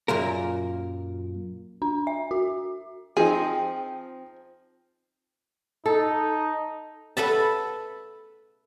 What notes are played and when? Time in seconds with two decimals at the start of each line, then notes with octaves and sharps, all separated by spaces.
0.08 F#2 A#2 A#3 A#4
1.82 D4
2.07 E5
2.31 F#4
3.17 F3 C4 D#4 G#4
5.86 D#4 A4
7.17 A4 B4 E5 A5